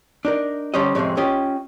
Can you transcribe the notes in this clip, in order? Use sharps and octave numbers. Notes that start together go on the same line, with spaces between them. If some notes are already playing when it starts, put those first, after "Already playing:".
D4 D#4 A#4
D3 G3 C#4 C5 D#5
F2 A2 C3 G#3
C#4 F4 G4 D#5